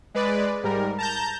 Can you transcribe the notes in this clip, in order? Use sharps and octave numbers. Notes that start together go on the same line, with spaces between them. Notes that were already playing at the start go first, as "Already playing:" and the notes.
G#3 B4 D5
G#2 G3 A#4
A5 A#5 G6